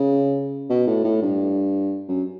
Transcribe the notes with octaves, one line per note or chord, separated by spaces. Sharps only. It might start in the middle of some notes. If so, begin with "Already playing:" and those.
Already playing: C#3
B2
A2
A2
G2
F#2